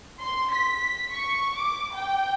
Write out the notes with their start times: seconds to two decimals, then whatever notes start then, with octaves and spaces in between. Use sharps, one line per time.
0.20 C6
0.53 B6
1.11 C#6
1.56 D6
1.94 G5